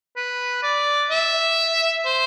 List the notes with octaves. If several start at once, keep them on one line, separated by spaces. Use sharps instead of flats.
B4
D5
E5
C5